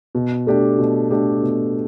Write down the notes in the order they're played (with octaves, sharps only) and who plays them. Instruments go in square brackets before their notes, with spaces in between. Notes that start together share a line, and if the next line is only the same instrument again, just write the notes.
[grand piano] B2
A3 D4 G4
B2
A3 D4 G4
B2